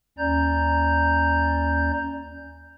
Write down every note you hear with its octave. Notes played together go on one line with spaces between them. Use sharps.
D#2 C#4 D5 A#5 G6